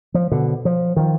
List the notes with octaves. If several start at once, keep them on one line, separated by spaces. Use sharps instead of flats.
F3
B2 D3
F3
D#3 F3